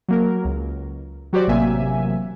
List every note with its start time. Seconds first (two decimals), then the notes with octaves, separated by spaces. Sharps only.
0.08 F#3 A#3 A#4
0.45 C#2
1.33 F#3 F#4 G4 C5 D5
1.47 A1 C3 F#3 A#3 E5 G#5